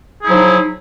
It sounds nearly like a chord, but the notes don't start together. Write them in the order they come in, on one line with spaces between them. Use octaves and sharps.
G#4 E4 F#3 F3 D#4